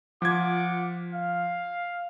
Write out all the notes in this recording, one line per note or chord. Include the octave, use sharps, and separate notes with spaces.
F3 F4 F#5 D6 G#6
F5